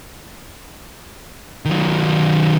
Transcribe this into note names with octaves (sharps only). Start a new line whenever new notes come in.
D#3 F#3